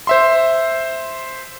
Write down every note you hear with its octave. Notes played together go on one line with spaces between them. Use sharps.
C5 E5 C6